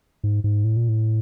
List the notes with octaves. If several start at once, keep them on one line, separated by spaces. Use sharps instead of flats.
G#2
G#2
A2
A#2
A2